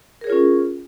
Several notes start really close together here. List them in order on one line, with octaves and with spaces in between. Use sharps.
A#4 G#4 C#5 F4 C#4